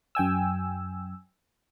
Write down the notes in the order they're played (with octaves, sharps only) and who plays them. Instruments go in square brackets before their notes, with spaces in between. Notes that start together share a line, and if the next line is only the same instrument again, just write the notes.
[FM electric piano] F#2 G5 G#5 E6